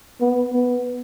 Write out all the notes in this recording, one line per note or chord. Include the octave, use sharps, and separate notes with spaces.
B3
B3